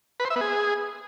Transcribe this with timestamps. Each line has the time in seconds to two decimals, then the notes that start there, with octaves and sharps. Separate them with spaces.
0.20 B4
0.25 C5
0.30 E5
0.36 B3
0.41 G#4